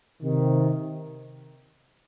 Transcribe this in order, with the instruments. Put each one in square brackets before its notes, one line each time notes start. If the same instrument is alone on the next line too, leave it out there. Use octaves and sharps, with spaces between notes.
[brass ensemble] C3 D#3